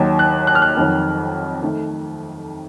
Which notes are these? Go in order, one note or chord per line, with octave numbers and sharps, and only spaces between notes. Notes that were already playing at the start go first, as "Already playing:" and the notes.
Already playing: D#2 D#3 F#3
F#6
F#6
F6
F#6
F2 D#3 F#3
D#3 A3